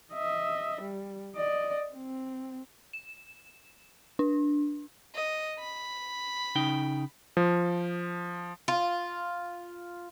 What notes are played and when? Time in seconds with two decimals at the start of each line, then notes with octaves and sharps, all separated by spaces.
0.13 D#5 E5
0.81 G3
1.35 D5 D#5
1.93 C4
2.93 E7
4.19 D4
5.15 D#5
5.60 B5
6.55 C#3 D#4 G5
7.37 F3
8.68 F4